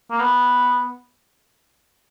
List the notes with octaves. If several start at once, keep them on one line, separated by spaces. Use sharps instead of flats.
A#3
B3